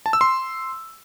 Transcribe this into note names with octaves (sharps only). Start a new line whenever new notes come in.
A5
E6
C6